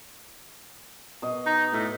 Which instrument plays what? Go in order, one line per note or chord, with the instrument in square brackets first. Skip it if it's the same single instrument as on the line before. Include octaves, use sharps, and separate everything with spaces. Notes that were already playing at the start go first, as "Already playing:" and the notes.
[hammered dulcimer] B2 D#5
[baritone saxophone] D#4
A2